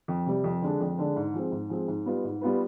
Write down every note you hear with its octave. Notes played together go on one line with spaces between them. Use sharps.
F2
C3 G3
F2
D3 G#3 D4
F2
D3 G#3 D4
G#2
F3 G#3 C4
G#2
F3 G#3 C4
G#2
G3 B3 F4 B4
G#2
G3 B3 F4 B4